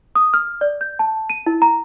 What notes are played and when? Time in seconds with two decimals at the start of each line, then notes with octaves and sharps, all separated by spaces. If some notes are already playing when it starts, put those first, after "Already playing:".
0.16 D#6
0.34 F6
0.61 D5
0.81 G6
0.99 A5
1.30 D#7
1.46 E4
1.62 A#5